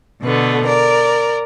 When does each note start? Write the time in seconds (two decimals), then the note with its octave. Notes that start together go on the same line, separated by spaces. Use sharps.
0.23 B2 D3 A3 B3
0.66 A#4 D5